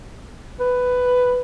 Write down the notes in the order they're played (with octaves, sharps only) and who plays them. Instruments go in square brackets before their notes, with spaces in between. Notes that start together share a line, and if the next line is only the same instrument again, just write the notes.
[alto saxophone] B4